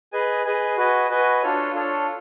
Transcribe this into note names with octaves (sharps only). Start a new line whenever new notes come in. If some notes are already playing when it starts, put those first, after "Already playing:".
G#4 B4 D#5 G#5
G#4 B4 D#5 G#5
F#4 B4 D#5 G#5
F#4 B4 D#5 G#5
D4 F4 A4 C#5
D4 F4 A4 C#5